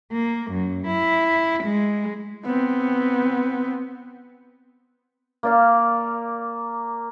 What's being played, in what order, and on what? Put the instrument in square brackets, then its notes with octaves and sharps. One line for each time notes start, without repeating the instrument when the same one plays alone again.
[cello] A#3
F#2
E4
G#3
[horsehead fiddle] B3 C4
[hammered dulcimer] A#3 D5 F5